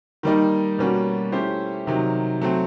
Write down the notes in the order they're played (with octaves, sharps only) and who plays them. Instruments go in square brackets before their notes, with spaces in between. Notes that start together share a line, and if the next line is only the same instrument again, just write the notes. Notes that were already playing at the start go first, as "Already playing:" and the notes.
[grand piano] D#3 G3 A#3 D#4
B2 G3 A#3 C#4 F#4
A3 C#4 E4 G4 C5
C3 D#3 F#3
F#3 A3 C4